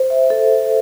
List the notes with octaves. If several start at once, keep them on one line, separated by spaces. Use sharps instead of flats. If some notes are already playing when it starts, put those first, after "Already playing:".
Already playing: C5
E5
A4